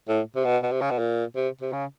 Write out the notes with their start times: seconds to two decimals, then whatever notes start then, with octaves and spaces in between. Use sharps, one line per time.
0.08 A2
0.36 C3
0.45 B2
0.63 B2
0.72 C3
0.81 C#3
0.91 B2
0.99 A#2
1.36 C3
1.61 C3
1.72 C#3